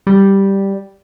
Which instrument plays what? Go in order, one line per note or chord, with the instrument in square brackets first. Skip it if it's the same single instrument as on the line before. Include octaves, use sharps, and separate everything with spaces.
[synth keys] G3